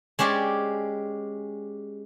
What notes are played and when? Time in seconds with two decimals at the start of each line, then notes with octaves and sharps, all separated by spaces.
0.19 G#3 C#4 G4 C5 D5